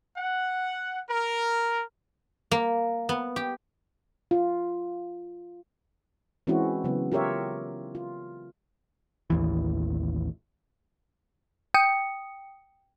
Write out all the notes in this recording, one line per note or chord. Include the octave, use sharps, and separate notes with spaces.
F#5
A#4
A#3
B3
G4
F4
E3 G#3 C4 C#4 E4 F#4
C#3 F#3 B3
F4 G4 A#4 C#5 E5
F4
A1 D#2 E3
G5 D#6 C#7